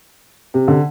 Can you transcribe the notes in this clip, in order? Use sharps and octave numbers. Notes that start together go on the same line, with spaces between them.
C3
D3